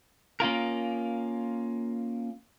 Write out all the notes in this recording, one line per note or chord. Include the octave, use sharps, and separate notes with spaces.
A#3 C#4 F4 A#4